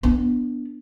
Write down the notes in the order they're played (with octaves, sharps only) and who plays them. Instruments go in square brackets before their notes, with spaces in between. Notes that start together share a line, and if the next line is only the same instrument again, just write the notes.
[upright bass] B3 D4